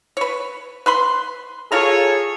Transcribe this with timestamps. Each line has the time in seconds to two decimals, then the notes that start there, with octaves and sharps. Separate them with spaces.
0.17 B4 C#5
0.86 B4 B5 C6
1.72 F4 G#4 A4 C#5 F5 A#5